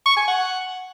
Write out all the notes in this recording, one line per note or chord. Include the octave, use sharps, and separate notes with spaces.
C#6
G#5
F#5